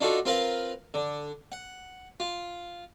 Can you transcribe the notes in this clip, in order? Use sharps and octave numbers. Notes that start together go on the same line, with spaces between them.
D4 D#4 F4 F#4 A4
C4 F4 A#4 B4 F5
D3
F#5
F4